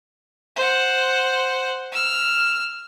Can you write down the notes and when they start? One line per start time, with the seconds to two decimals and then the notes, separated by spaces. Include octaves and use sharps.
0.56 C5 F#5
1.92 E6 F6